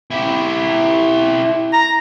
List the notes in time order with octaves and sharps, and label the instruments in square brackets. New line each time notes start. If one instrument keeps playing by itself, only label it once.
[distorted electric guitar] E4 G4
[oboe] A#5